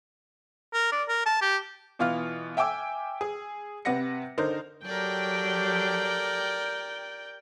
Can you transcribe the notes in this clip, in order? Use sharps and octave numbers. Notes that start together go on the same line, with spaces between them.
A#4
D5
A#4
A5
G4
B2 E3 F4 F5 F6
E5 G5 G#5 D6 E6
G#4
C3 B4 F#5 A#6 C#7
D3 D#4 A#4 C5
F#3 G4 A4 A#4 D5 G5